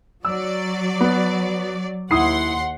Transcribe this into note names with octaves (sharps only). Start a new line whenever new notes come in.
F#3 D5 E6
B3
D#2 E4 F#5 C6 D#6 C7